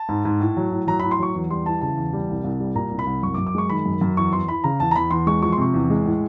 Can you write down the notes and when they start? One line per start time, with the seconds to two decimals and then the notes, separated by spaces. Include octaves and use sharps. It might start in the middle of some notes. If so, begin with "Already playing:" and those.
Already playing: A5
0.09 G#2
0.25 G#2
0.40 A2
0.57 F#3
0.72 A2
0.87 F#3 A#5
0.99 A2 B5
1.11 C6
1.19 F#3 C#6
1.35 E2
1.50 G3 C6
1.66 E3 A5
1.81 C#3 A5
1.97 E2
2.13 G3
2.29 C2
2.44 C2
2.60 G3
2.75 A#2 A#5
2.91 C2
2.99 B5
3.07 C2
3.22 F#2 C#6
3.34 D6
3.38 F#2
3.47 D6
3.55 G#3 C#6
3.69 D#3 B5
3.86 F#2
4.01 F#2
4.16 E2 C#6
4.33 E2 C6
4.48 E3 B5
4.64 C#3 A#5
4.80 E2 A5
4.91 A#5
4.96 E2 B5
5.10 E2 C6
5.27 G#3 C#6
5.42 F3 C#6
5.52 C6
5.58 C3 C#6
5.74 E2
5.90 G#3
6.05 A2